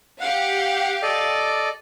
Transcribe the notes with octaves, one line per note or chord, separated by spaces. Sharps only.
G4 F5 F#5
A4 D5 D#5